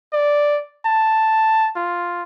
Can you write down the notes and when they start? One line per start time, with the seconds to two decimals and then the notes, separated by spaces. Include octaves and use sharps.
0.13 D5
0.86 A5
1.76 F4